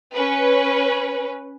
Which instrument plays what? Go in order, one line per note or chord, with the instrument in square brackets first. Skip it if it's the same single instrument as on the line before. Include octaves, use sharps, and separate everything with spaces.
[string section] C#4 B4